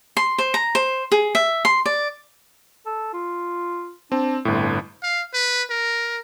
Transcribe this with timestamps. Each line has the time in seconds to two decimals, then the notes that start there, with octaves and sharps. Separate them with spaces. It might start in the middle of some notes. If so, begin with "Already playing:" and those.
0.17 C6
0.38 C5
0.54 A#5
0.75 C5
1.12 G#4
1.35 E5
1.65 C6
1.86 D5
2.86 A4
3.13 F4
4.12 C4 D4
4.45 G1 A2 C4
5.03 F5
5.34 B4
5.70 A#4